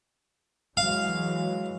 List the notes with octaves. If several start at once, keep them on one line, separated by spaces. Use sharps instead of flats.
E3 F#3 G#3 F5